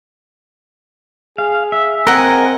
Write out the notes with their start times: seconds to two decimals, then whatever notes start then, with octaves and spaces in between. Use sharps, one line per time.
1.38 G#4 F5
1.72 E5
2.07 C4 A#4 D#5 F#5 G#5